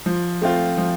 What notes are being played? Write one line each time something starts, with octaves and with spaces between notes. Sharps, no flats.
F3
A3 C4 F4
F3